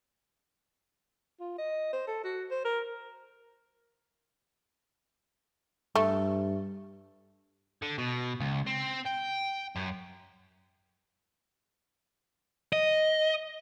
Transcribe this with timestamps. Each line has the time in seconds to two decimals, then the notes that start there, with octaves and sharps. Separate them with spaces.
1.40 F4
1.58 D#5
1.93 C5
2.08 A4
2.24 F#4
2.51 C5
2.65 A#4
5.96 G2 A3
7.82 D3
7.98 B2
8.40 C#2
8.67 C4
9.06 G5
9.76 F#2
12.73 D#5